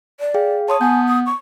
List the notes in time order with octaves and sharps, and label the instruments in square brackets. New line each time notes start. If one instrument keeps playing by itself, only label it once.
[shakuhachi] D5
[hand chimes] G#4 F5 G5
[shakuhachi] C#5 [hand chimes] A5 C6 D#6
[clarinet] B3 [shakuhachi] G#5 [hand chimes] G6
[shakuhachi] D#6
C#6